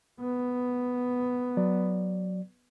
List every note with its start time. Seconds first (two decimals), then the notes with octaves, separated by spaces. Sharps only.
0.21 B3
1.57 F#3 D5